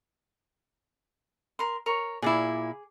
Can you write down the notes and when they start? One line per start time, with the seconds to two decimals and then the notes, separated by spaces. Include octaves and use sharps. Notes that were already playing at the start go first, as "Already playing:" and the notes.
1.59 A#4 C6
1.86 A#4 C#5
2.22 A#2 E4 G#4 D6